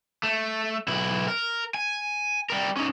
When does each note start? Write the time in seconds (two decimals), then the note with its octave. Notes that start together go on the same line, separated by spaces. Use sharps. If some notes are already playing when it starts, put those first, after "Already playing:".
0.23 A3
0.88 B1 E4
1.28 A#4
1.74 G#5
2.50 G3 A#4
2.77 C#4 D#4